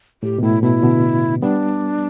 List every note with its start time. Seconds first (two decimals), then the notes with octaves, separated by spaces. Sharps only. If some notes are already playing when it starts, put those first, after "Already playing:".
0.23 A2 G4
0.38 B2
0.43 A2 E4
0.62 B2 E4
0.83 B2 D3
1.42 G3 B3 D4